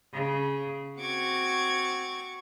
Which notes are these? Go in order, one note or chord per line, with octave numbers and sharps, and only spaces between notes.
C#3
C4 F#4 C#6 D6 G#6